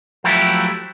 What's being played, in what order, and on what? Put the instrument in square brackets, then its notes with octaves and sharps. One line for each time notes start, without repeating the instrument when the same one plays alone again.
[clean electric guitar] F3 F#3 A3 E4 G4